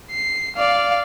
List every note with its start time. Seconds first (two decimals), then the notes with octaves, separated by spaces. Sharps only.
0.11 C7
0.56 D5 F5